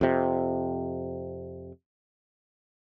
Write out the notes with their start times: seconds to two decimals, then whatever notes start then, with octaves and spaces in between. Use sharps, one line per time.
0.01 F2 C3